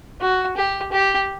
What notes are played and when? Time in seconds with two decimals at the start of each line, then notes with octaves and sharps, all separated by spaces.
0.21 F#4
0.57 G4
0.92 G4